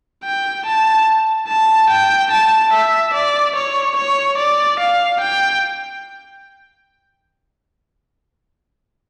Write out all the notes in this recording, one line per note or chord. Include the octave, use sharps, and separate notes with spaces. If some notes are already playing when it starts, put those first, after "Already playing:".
G5
A5
A5
G5
A5
E5
D5
C#5
C#5
D5
F5
G5